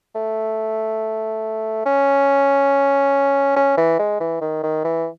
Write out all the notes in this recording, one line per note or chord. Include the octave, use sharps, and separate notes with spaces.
A3
C#4
C#4
E3
G#3
E3
D#3
D#3
E3